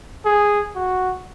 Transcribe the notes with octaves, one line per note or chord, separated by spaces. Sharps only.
G#4
F#4